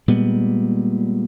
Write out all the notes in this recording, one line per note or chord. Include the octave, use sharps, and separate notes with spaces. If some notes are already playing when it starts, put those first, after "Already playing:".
A#2 G3 G#3 B3